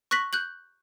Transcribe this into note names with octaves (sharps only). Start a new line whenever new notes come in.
C#6 F#6 A#6 B6 F#7
F#6 G6 F#7